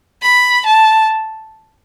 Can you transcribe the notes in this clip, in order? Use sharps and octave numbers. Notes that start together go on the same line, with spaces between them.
B5
A5